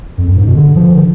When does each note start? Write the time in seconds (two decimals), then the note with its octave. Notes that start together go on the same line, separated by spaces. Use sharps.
0.18 F2
0.28 F#2
0.37 G#2
0.47 B2
0.56 D3
0.75 F3
0.95 D3